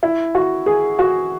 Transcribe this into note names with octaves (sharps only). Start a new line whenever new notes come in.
E4
F#4
G#4
F#4